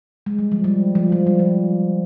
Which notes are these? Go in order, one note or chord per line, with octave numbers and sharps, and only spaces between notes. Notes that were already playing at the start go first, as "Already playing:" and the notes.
G#3
G3
F3
G3
F3
F3
G3
F3